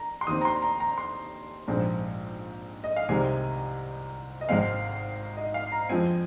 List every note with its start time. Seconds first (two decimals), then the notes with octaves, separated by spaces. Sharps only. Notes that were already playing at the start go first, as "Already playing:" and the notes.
Already playing: A#5
0.21 C6
0.27 D#2 D#3 C4 D#6
0.41 A#5
0.45 C6
0.62 A#5
0.80 A#5
0.98 C6
1.68 A#1 G#2 G#3 C4
2.84 D#5
2.96 F5
3.09 C2 C3 D#3 G#3 C4 G#5
4.41 D#5
4.49 G#1 G#2 D#3 G#3 C4 F5
5.37 D#5
5.54 F5
5.72 A#5
5.89 F2 F3 G#3 C4 G#5